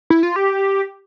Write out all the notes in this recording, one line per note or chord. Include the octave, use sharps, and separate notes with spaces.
E4
F4
G4